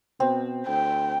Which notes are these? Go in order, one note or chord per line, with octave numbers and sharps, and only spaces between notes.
B2 C4
D2 G5